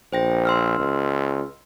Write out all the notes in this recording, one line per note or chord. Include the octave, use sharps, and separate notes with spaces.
A#1 C5 G5 A#6
C6 E6 F6
C#2